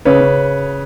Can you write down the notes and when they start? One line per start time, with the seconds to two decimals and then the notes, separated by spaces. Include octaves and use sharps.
0.05 C#3 B4 C#5
0.21 C#3